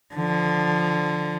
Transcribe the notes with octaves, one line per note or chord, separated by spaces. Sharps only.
D3 F3